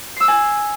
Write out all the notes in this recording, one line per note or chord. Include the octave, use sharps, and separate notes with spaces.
G#5 D#6 E6 C7